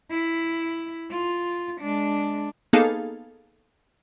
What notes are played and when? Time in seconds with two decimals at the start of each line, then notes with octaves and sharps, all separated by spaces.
0.10 E4
1.11 F4
1.81 G#3 D4
2.73 A#3 B3 D#4 G#4 A4 F5